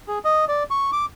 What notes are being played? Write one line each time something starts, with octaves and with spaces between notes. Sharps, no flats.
G#4
D#5
D5
C#6
D6